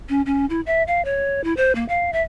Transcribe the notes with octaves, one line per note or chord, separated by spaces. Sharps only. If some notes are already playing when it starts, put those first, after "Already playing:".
C#4
C#4
E4
E5
F5
C#5
E4
C5
A#3
F5
E5